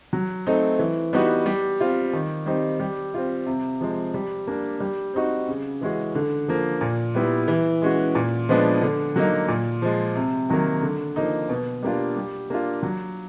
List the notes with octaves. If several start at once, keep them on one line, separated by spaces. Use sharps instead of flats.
F#3
A3 C4 D#4
E3
G3 B3 D#4 F#4
G3
C4 F4
D#3
G3 C4 D#4
G3
C4 F4
C3
F3 G#3 C4
G3
A#3 D4
G3
C4 D#4 F#4
C#3
E3 G#3 C#4 F#4
D3
F3 A#3
A#2
G3 B3 E4
E3
G#3 C#4 F#4
A#2
F3 G#3 B3 D4
D3
F#3 A#3 D#4
A#2
F3 G#3
C3
D#3 F#3 A#3
D3
F3 A#3 D#4
B2
G3 A#3 D4 F4
G3
A#3 D4 F4
F#3